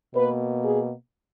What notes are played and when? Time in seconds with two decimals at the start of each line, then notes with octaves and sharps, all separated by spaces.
0.14 B2 A#3 B4
0.63 G#4